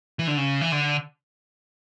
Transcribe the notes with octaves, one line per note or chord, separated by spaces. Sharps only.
E3
D3
C#3
E3
D3